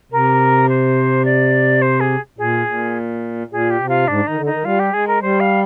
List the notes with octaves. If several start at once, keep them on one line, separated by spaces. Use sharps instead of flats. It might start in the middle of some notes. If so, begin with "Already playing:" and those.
C3 A#4
C5
D5
C5
G#4
A#2 G#4
A#2
A#2 G#4
G4
C3
F4
G#2 D4
D#3 D#4
D3
D#3 D#4
G3 F4
G4
G#3 G#4
A#4
G3 C5
F5